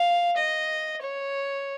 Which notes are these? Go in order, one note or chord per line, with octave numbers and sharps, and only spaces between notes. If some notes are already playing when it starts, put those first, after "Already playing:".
Already playing: F5
D#5
C#5